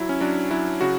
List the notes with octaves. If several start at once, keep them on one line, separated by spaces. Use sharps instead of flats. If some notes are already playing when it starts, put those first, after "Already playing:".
Already playing: F#3 E4
C#4
F#3 D4
F#3 E4
C#3 F#4